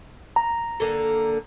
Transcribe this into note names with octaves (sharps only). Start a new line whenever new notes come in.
A#5
D3 A#3 A4